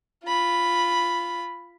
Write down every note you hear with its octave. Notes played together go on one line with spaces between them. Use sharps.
F4 B5